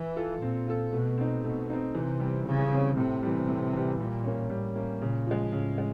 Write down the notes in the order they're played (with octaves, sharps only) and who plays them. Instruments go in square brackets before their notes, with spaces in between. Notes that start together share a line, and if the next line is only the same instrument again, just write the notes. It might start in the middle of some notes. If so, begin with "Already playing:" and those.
Already playing: [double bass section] E3
[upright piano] F4 A4
[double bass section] A#2 [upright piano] C4
[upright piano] F4 A4
[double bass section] B2 [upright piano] A3
[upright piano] C4 D#4
[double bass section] B2 [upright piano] A3
[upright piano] C4 D#4
[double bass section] C3 [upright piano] E3
[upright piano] G3 C4
[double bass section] C#3 [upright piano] E3
[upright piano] G3 C4
[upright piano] A2 [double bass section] C3
[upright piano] E3 G3
A2
E3 G3
[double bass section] A#2 [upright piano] G3
[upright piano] A#3 C#4
[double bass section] A2 [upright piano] G3
[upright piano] A#3 C#4
[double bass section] A#2 [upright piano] C#3
[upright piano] F3 G#3
[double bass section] A2 [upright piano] C#3
[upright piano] G#3